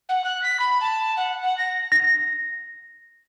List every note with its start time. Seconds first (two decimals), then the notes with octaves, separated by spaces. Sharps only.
0.09 F#5
0.24 F#6
0.42 B6
0.59 B5
0.81 A5
1.16 F#5
1.42 F#5
1.57 A#6
1.92 A#6